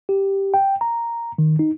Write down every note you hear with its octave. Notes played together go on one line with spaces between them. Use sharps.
G4
G5
A#5
D#3
D#4